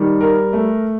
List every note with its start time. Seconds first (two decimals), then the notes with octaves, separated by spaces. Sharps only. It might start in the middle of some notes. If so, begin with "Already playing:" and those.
Already playing: D#3 G3
0.21 A#4
0.53 A3